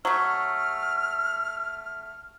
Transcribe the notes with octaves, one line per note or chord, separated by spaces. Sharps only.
F#3 A3 F6